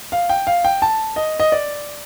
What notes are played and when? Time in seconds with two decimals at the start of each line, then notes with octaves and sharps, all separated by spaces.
0.12 F5
0.29 G5
0.47 F5
0.65 G5
0.82 A5
1.16 D#5
1.40 D#5
1.52 D5